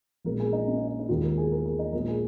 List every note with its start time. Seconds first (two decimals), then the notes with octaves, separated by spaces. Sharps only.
0.25 A#1 A#2 F3 G#3 A#4
0.40 G#4
0.53 D#4
0.67 C#4
0.77 D#4
0.88 D#4
0.99 D#4
1.09 D#2 D#3 G#3 F4
1.23 A#4
1.38 G#4
1.52 A#4
1.66 G#4
1.79 D#4
1.93 A#1 A#2 F3 G#3 A#4
2.08 G#4